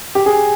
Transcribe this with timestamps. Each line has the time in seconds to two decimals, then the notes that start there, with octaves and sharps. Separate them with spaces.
0.15 G4
0.26 G#4